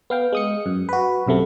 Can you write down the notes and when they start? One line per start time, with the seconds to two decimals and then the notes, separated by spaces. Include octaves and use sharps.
0.10 B3 F5 G5
0.33 G#3 D#6 C#7
0.66 F#2
0.89 F#4 B4
1.27 B1 F#2 C3 A3